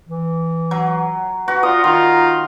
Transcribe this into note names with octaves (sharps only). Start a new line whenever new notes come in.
E3
F#3
F#4 B4
F4 D5 D#6
D#3 F4 A#5